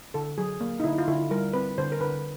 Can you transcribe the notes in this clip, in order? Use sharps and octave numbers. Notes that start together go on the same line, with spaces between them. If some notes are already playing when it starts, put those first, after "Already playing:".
D3 A4
F#3 G#4
A#3
D#4
D3 E4
F4
D3 E4
G3 A#4
C4 B4
D3 C5
A#4
D3 B4